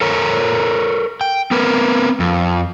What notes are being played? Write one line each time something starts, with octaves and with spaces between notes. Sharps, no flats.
A4 A#4 C#5 A#5
G5
B3 C4 A#4 B4
F2